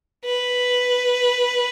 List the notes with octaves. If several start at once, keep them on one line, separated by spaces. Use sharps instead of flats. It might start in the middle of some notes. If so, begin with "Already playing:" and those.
B4